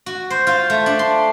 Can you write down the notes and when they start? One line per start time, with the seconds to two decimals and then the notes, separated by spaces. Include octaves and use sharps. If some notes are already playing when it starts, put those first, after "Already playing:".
0.06 F#4
0.30 C5
0.47 F4
0.70 A3
0.86 D4
0.99 C6